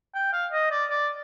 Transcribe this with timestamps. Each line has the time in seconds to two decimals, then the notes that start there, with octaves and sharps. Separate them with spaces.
0.15 G5
0.33 F5
0.52 D#5
0.71 D5
0.90 D5